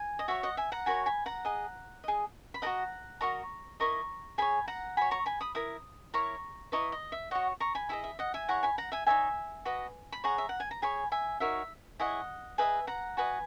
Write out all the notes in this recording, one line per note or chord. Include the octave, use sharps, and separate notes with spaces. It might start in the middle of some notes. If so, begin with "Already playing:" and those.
Already playing: G#5
D#5
F#4 C#5 E5
D#5 F#5
E5 G#5
F#5 A#5
F#4 A#4 C#5 G#5 B5
G#5 B5
F#5 A#5
G#4 D#5
G#4 D#5
B5
F#4 A#4 D#5 F#5 A#5
F#4 A#4 D#5 A#5 C#6
E4 A#4 D#5 A#5 C#6
G#4 C#5 G#5 B5
F#5 A#5
F#4 C#5 G#5 B5
A#5 C#6
G#5 B5
B5 D#6
E4 A#4 D#6
E4 A#4 C#5 A#5 C#6
E4 B4 D#5 A#5 C#6
D#5
E5
F#4 C#5 D#5 F#5
A#5 C#6
G#5 B5
E4 G#4 D#5 E5
E5
D#5 F#5
E5 G#5
E4 G#4 C#5 F#5 A#5
G#5 B5
F#5 A#5
E5 G#5
D#4 A#4 C#5 E5 G#5
F#4 B4 D#5
B5
G#4 C#5 F#5 A#5
E5
F#5
G#5
A#5
G#4 C#5 G#5 B5
E5 G#5
D#4 F#4 A#4 C#5 E5
E4 G#4 C#5 D#5 F#5
G#4 B4 D#5 E5 G#5
F#5 A#5
F#4 B4 D#5 G#5 B5